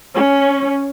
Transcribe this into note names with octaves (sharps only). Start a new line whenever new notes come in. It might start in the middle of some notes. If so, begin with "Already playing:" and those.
C#4